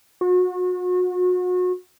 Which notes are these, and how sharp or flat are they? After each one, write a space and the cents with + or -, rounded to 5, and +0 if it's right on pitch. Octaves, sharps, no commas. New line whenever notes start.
F#4 -35